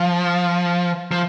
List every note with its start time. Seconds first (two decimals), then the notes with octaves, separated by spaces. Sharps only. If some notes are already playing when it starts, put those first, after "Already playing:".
Already playing: F3
1.12 F3